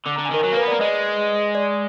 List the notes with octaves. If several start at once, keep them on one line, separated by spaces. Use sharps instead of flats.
D3 D6
D3 A#5
G#5
D#3 A#4
F#3 A#4
A#3 B4
B3
A#3 D5
G#3 D#5
D5